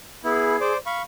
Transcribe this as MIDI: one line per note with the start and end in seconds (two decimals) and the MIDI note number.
0.24 0.56 59
0.24 0.56 64
0.24 0.73 68
0.61 0.77 72
0.61 0.77 74
0.86 1.02 77
0.86 1.02 83
0.86 1.02 85